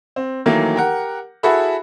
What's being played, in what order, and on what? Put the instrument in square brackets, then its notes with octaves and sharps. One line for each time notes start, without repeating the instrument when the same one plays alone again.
[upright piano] C4
D#3 E3 F#3 A3 A#3
G4 A#4 F#5
E4 F#4 G#4 A4 E5 B5